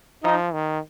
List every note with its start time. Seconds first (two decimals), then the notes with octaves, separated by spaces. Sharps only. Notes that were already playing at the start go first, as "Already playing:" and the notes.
0.24 F3 D#4
0.53 D#3